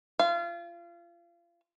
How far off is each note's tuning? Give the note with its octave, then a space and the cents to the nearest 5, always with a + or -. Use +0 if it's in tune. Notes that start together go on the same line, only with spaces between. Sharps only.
F4 -30 F5 -30